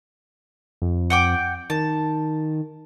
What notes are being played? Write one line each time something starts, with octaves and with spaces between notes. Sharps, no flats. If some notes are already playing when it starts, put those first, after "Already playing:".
F2
F#5 G5 D6
D#3 A5